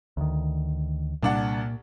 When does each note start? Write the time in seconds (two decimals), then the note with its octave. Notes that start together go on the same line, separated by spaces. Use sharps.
0.17 D2 D#3
1.23 C2 A#2 D4 F#5